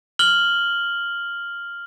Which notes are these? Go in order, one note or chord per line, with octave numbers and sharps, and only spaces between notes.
F6 F#7 G7